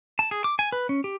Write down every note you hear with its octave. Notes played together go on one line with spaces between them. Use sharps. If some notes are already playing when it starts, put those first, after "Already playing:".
A5
G#4
D6
G#5
B4
C#4
G4